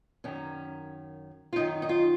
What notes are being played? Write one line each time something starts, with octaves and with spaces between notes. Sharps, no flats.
F#2 D#3 C#4
F4
F#2 D#3 D#4
D#4
F4